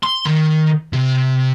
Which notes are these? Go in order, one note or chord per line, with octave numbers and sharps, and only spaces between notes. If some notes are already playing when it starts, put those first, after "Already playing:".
C6
D#3
C3